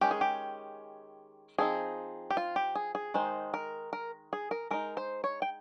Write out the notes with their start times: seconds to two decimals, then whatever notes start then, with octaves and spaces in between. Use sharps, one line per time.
0.01 D#3 G#3 C#4 G4
0.11 G#4
0.21 G4
1.58 F3 C4 D#4 G#4
2.30 G4
2.37 F4
2.56 G4
2.75 G#4
2.95 G#4
3.14 D#3 G#3 D#4 C5
3.54 A#4
3.93 A#4
4.33 G#4
4.51 A#4
4.70 G#3 D#4 A#4
4.97 C5
5.24 C#5
5.42 G5